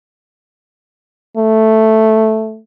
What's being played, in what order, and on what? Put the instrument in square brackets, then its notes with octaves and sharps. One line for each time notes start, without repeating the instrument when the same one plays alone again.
[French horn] A3